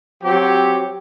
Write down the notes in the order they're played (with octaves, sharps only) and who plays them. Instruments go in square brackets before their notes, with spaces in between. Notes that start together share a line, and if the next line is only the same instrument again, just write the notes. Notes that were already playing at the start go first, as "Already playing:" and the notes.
[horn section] F#3 C4 G4